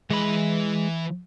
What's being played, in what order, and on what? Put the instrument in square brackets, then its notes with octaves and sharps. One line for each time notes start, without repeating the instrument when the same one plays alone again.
[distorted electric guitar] E3 B5 [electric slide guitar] G#3